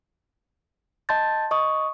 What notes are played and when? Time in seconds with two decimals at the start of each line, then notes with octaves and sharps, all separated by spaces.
1.09 D#5 A5 C6 G6 A6
1.51 D#5 C#6 D#6